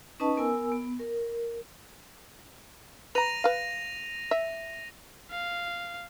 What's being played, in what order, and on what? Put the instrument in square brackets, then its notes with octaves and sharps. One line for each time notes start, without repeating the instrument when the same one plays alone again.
[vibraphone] C#4 D#4 B4 D#5 A5 C#6
B3 A#4 G#5 E6
B3
A#4
[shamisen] B4 A#5 [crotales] A#6 D#7 F7
[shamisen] B4 F5
E5
[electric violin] F5